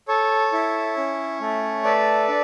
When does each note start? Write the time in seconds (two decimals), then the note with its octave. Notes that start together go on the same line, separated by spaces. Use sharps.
0.08 A4 C#5
0.53 E4
0.97 C#4
1.40 A3
1.84 A4 B4 D5
2.28 D4